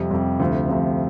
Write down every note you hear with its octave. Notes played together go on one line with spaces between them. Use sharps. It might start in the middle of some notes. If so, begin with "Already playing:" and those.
Already playing: F2 C3 G3
F2 C3 G3
D2 C3 F3
D2 C3 F3